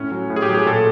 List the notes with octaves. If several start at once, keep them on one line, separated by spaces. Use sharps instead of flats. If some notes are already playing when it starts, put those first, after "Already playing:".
Already playing: A2 C#4
F#3
A2
G#4
G4
F#3
G#4
A#2 A4